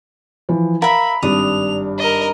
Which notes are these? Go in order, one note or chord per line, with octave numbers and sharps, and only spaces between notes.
E3 F3
A#4 E5 F5 B5
G#1 G2 D4 D#6 F7
A#4 D#5